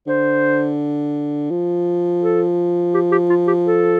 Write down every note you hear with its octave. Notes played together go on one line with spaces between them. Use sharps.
D3 C5
F3
A4
G4
G4
F4
G4
A4